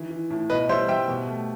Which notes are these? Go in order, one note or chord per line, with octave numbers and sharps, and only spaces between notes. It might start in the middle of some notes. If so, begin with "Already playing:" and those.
Already playing: D#3 E3
E3
A2
B2 B4 D#5
G3 C5 E5
G3 E5 G5
B2
A3